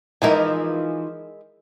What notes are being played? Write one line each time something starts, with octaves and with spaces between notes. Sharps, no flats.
E3 F3 G#3 D#4 E4 A#4